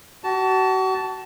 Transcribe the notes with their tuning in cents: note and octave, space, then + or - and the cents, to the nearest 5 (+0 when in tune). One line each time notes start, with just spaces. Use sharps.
F#4 +35 A5 +0